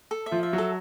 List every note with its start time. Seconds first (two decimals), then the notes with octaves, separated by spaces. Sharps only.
0.11 A4
0.26 E5
0.31 F3 F4
0.43 E5
0.53 F#3 F#4
0.58 A4